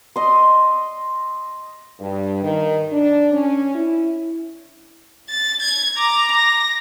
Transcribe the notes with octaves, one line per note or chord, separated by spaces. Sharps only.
D#5 C6
G2
D#3
D4
C#4
E4
A6
G#6
A#5 D6
A#6